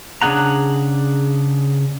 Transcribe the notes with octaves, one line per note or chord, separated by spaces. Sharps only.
C#3 D4 G#4 F#5 A#5